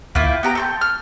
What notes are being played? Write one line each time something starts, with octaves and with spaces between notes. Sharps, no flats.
D2 A#3 E4 F4 E5
G5
B3 G4 A#5
A4 C6 G6
F6